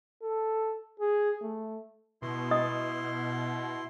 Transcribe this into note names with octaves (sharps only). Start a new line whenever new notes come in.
A4
G#4
A3
B2 E4 C6
D#5 D#6